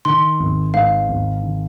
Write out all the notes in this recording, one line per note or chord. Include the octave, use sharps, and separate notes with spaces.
D#3 C6
G#1
G#2 F5
G#1
D#3